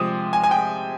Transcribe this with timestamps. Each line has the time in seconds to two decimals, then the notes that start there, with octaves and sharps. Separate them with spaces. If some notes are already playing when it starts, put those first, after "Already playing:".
Already playing: C3 F3 G#3 D#6
0.33 G#5
0.44 G#5
0.51 G5